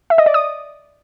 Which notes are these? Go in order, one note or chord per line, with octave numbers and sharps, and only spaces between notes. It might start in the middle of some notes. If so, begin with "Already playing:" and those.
E5
D#5
D5
D#6